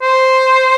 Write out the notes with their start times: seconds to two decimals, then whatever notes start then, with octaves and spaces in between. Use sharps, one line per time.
0.02 C5